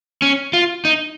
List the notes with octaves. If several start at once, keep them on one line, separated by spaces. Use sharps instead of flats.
C#4
F4
D#4